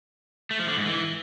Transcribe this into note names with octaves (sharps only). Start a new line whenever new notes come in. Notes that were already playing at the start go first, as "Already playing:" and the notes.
A3
F3
D3
G#2
E3